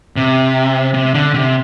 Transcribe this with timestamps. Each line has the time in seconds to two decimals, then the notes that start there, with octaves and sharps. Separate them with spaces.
0.17 C3
0.94 C3
1.14 D3
1.34 C3